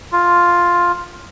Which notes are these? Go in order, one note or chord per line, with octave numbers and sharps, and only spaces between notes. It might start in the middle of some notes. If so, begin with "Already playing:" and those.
F4